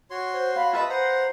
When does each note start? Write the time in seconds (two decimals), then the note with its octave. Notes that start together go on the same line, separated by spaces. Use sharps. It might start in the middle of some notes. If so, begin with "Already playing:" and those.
0.11 F#4 C#5 C6
0.33 C5
0.56 F5 B5
0.73 F4 B4 D#5 E5 A5 B5
0.89 C5 F#5 A#5